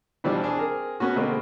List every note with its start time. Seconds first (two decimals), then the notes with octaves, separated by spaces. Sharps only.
0.24 B2 E3 F3 G3 D4
0.44 D4 G#4
0.56 C4 G#4 A#4
1.00 B3 C#4 F#4
1.16 B2 D3 G#3 A#3 C4